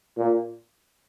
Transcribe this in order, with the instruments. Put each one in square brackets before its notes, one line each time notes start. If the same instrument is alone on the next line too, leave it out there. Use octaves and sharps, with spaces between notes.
[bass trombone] A#2